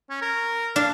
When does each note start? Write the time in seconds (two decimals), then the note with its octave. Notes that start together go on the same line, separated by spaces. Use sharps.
0.10 C#4
0.22 A#4
0.76 D4 F5